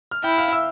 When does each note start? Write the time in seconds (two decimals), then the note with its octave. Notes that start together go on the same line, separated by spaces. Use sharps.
0.11 F6
0.24 E4 G5 G6
0.38 F5 F6
0.52 E5 E6